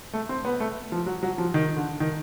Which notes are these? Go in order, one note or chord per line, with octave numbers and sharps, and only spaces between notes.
A3
C4
B3
A3
F3
F#3
F#3
F3
D#3
D3
D#3